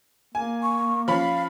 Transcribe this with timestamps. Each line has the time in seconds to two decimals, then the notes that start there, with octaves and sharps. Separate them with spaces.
0.35 A#3 G#5
0.63 C#6
1.08 F3 C#4 F5 B5